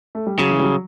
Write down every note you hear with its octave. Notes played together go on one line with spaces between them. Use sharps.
A3
G3
C#3 F#3
E3
G3
F#3